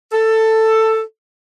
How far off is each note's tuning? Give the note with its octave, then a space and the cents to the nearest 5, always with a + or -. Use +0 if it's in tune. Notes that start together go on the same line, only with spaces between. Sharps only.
A4 +10